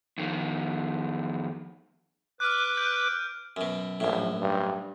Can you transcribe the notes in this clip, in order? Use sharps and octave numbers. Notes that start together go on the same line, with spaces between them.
F2 D#3
B4 D6 F6 F#6
G6 D7
F#2 B2
A#1 F#2 A2
G2